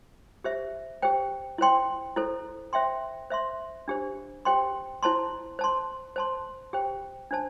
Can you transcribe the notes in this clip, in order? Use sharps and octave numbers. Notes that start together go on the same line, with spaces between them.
G4 C5 E5
G4 C5 G5
E4 C5 G5 C6
E4 A4 C5
C5 E5 G5 C6
C5 E5 C6
D4 G4 C5
G4 C5 G5 C6
E4 C5 A5 C6
C5 A5 C6
C5 A5 C6
G4 C5 G5
D4 C5 A5